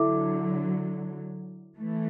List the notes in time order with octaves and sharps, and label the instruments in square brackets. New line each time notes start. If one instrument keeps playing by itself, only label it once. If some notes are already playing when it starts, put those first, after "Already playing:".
Already playing: [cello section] D3 F#3 [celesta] E4 A4 E5 D6
[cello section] E3 A3